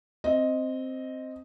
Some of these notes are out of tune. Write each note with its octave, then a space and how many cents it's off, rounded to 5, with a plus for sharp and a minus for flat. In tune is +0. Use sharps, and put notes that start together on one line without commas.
C4 +0 D#5 +0